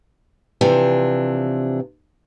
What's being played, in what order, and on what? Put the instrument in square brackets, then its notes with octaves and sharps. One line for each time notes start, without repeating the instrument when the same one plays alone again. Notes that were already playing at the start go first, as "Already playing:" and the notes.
[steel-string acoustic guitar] C3 E3 F3 D4